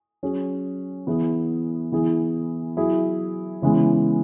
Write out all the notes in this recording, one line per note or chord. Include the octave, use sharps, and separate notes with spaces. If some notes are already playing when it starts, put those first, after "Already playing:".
F#3 C#4 G#4
E3 B3 E4 G#4
E3 B3 E4 G#4
F#3 E4 G#4
C#3 E3 G#3 B3